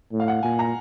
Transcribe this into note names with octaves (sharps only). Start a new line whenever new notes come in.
A2
F5
F#5
A#2 G#5
A#5